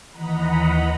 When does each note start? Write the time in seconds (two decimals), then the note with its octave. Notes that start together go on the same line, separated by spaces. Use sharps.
0.10 D#2 E3 D#5 F#5 A#5 B5